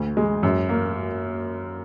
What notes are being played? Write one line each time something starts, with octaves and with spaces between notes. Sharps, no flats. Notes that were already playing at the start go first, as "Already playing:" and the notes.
Already playing: D2
G#3
F#2
A#3